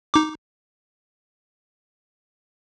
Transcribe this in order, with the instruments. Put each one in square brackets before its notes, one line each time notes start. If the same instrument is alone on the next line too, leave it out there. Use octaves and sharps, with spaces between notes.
[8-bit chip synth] D#4 D6